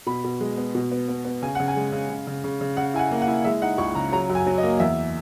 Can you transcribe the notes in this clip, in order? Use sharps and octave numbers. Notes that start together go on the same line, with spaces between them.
B2 B5
B2
G#3
B3
B2
B3
B3
B3
C#3 G#5
C#3 F#5
G#5
G#3
C#3
C#3
C#3
C#3
C#3
C#3 F#5
E4 G#5
F#5
A#3
F#5
E4
G#3 E5
D#4 F#5
C#2 C#6
C#3 A#5
F#3 A#5
F#2
G#5
F#3
D#5
A#3
E2 E5